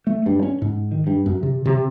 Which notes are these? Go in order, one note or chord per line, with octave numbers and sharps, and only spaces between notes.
A3
G2
C#4
G#2
D#3
G2
F#2
C3
C3